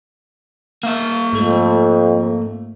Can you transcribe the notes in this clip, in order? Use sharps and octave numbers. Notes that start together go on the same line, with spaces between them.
A#3 E5 F5
F2 G#2 A3